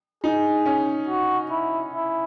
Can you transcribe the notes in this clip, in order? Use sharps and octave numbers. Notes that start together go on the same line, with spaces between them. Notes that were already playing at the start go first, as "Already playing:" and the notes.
D#4 G#4
C#4
F#4
E4
E4